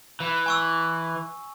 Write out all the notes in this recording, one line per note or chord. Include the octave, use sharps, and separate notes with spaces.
E3
G#5 C#6 E6